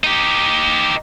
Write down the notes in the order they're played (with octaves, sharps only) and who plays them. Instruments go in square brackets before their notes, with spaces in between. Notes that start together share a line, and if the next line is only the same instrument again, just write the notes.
[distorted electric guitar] D#4 G4